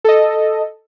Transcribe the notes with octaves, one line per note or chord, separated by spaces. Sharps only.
A4 D#5